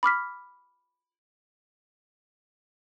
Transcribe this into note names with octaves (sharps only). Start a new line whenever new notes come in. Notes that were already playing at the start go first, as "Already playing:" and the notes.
B5 D6 F6 B6